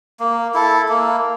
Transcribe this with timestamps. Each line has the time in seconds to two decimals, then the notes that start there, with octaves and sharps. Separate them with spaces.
0.20 A#3
0.54 E4 A4
0.89 A#3